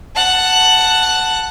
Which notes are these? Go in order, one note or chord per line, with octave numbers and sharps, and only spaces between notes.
F#5 A5